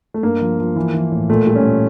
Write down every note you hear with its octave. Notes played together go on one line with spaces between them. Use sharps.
A3
G2 A#3
F3
F3
E3
E3
A2
A#2 A3
G3
C#4
A#2